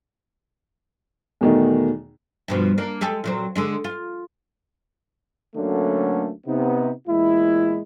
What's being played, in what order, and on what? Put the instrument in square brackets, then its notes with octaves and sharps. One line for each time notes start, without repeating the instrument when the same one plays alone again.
[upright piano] E2 B2 D#3 A3 D#4
[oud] G2 B2 F3
A#3 D4 A#4
G#3 G4 A4
A#2 F#3 C4
D3 G#3 D4
F4
[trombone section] D2 D3 F#3 A3 A#3 C#4
C3 B3 D#4
E2 A#2 G#3 E4